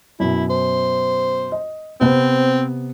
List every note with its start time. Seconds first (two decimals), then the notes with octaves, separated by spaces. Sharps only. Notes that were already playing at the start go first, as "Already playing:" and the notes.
0.20 F#2 B2 E4
0.50 C5
1.52 D#5
2.01 C3 B3 C4